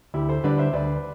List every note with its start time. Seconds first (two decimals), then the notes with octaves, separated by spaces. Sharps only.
0.14 D2 E4 G4
0.29 A4 C5
0.44 D3 G3 D4 B4 D5
0.58 C5 E5
0.73 D2 B4 D5